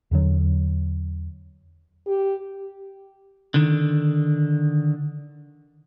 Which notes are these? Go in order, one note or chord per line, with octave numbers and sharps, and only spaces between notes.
E2 D3 F#3
G4
D3 D#3